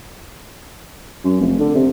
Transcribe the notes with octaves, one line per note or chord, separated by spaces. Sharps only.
F#2
F1
D3
C3